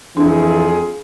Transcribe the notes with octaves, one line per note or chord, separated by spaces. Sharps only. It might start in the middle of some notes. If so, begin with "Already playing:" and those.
F2 E3 D4 F4 G#4